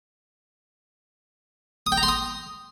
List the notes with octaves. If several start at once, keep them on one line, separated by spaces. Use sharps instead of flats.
D#6
G5
A#5
C6
D#6